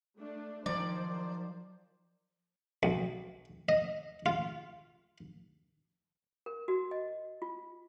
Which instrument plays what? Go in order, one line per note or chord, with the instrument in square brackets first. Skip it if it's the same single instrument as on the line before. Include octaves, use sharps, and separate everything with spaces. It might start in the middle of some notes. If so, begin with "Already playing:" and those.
[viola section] A3 D4
[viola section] D#3 C5 [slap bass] F3 F#3 [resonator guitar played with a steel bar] D5
[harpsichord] B1
D#5
F4
[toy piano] A#4
F#4
D#5
F4